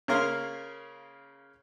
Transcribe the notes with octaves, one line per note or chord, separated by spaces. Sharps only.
C#3 A#3 C#4 A#4 F5 C6